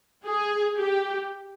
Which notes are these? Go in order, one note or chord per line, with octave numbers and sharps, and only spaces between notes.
G#4
G4